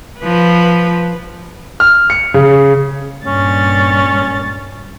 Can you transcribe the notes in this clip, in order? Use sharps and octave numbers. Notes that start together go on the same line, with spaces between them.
F3 B4
F6
C#7
C#3
G2 A#2 C#4 A6